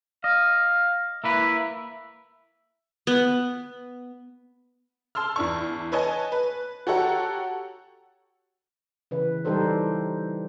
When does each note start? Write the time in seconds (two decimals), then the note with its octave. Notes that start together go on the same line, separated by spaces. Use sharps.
0.24 D#5 F5
1.24 A#3 E4 B4 E5
3.07 B3
5.15 A5 C6 E6 F6
5.36 E2 D4 C#6
5.92 B4 C#5 D#5 G#5 A5
6.32 B4
6.87 F#4 G4 A4 C#5 F#5 A#5
9.11 C#3 E3 B4
9.45 E3 G3 D#4 G4 A4 C5